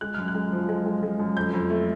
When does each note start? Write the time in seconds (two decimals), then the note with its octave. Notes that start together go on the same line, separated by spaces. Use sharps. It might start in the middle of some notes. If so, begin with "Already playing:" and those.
0.01 G#3 F#6
0.14 F#2 F6
0.28 F#6
0.35 G#3
0.53 F3
0.69 G#3
0.86 G#3
1.03 G#3
1.20 F#2
1.37 F2 G6
1.53 F2
1.70 A3